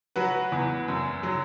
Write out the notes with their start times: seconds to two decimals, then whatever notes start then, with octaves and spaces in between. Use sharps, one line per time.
0.16 F#3 F#4 B4
0.52 E2
0.88 F#2
1.23 F#3